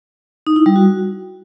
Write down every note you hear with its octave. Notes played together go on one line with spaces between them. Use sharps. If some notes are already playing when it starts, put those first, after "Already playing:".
D#4
E4
G3
F#4